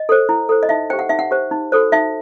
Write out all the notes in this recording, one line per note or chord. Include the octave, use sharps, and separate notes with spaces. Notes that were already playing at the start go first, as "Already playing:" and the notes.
Already playing: D#5
A4 C5
E4
A4 C5
D#5
D#4 E5
G4 C5 G5
F#5
D#4 E5
F#5
G4 C5
D#4
F#4 A4 C5
D#4 E5